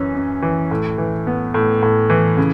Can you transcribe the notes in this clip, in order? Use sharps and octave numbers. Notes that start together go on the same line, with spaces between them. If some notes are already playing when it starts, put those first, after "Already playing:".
Already playing: F#2 E3 C#4
F#2
E3
A2
E3
B3
A2
A2
E3
C#3